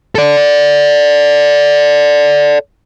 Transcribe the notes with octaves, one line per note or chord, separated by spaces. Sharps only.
A4 D5